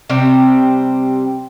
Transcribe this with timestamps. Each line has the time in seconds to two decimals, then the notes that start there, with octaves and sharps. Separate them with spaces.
0.09 C3 G3 C4